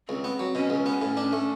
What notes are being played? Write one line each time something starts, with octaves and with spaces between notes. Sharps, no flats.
C#2 C4
B3
F#3
B2 C#4
C#2
B3
A2
D4
A3